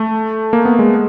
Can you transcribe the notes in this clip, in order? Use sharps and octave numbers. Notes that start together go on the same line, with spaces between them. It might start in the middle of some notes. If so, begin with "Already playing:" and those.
Already playing: A3
A#3
B3
G#3